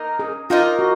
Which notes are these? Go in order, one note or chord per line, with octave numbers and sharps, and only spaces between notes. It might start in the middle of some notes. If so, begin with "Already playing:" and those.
Already playing: A#3 D#4 A#4 D#5
G#4
A#3 D#4 F4 A#4 D#5
F#4